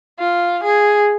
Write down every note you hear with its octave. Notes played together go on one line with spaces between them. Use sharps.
F4
G#4